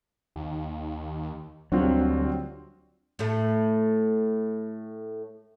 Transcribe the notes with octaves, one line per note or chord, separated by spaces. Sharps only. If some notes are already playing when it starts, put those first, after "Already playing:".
D#2
D2 F#3 G3 C4 D4 F4 F#4
A2 A3